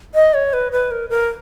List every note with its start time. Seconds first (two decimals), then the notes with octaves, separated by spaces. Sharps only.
0.14 D#5
0.34 C#5
0.53 B4
0.72 B4
0.91 A#4
1.10 A#4